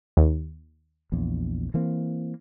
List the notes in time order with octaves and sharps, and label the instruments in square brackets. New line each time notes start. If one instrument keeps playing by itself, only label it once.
[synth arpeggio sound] D#2
[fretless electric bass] A#1 E2
E3 A#3 C4